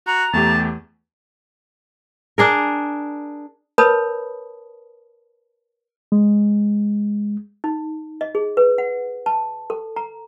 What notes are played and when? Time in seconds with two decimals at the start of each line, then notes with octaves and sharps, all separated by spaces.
0.07 F#4 A#5
0.33 E2 A3 G4 A5
2.38 D4 G#4 A#4
3.78 A#4 B4 C#5 A5 B5 D#6
6.12 G#3
7.64 D#4
8.21 D#5
8.35 G#4
8.57 B4
8.78 F#5
9.26 A5
9.70 A4
9.96 A#5